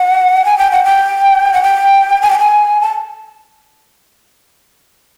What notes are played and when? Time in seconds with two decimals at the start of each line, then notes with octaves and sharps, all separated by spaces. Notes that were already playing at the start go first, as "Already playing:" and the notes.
Already playing: F#5
0.45 G#5
0.58 G5
0.72 F#5
0.84 G5
1.53 F#5
1.63 G5
2.22 G#5
2.30 G5
2.39 G#5
2.81 A5